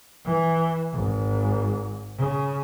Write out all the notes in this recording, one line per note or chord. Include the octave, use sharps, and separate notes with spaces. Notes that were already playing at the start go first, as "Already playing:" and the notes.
E3
G#1
C#3